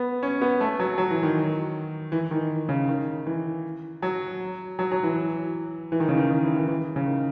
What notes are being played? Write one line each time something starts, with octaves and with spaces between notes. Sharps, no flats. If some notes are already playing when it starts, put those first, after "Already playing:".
Already playing: B3
C#4
B3
A3
F#3
F#3
E3
D#3
E3
D#3
C#3
D#3
E3
F#3
F#3
F#3
E3
E3
D#3
C#3
D#3
D#3
E3
E3
E3
C#3
D#3